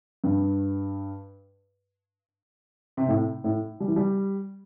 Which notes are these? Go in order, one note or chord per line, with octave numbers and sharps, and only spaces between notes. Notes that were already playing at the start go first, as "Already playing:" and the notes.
G2
C3
A2
A2
G3
E3
G3